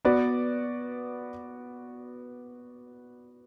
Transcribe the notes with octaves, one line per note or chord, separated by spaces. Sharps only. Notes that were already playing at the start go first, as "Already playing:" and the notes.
B3 F#4 B4 D5